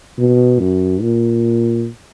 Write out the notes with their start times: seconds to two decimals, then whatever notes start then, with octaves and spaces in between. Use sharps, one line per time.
0.18 B2
0.60 F#2
1.02 A#2